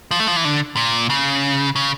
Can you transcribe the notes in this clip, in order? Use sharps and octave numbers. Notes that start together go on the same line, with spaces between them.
F3
A3
F3
E3
D3
A#2
C#3
C#3